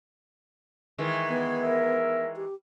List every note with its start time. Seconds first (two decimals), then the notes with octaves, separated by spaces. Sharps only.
0.98 D#3 E3 G#3
1.29 B3
1.62 A#4 E5
2.36 G4